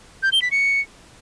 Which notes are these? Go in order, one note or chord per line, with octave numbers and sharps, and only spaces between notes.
G6
G7
B6
C#7